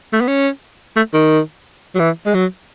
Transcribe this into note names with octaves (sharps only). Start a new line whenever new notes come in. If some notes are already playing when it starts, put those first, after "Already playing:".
A3
B3
C#4
A3
D#3
F#3
E3
G#3
F#3